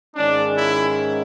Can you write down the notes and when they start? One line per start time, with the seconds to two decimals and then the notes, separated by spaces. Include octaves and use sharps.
0.16 G#2 D#3 G#3 C#4 D4
0.57 E4